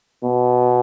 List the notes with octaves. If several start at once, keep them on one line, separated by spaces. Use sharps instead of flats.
B2